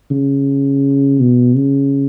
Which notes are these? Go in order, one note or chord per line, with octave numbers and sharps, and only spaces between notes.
C#3
B2
C#3